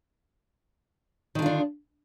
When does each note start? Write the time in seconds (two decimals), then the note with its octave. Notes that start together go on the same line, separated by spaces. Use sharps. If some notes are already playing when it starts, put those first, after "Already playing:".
1.35 D#3
1.39 D3
1.42 F4
1.46 D4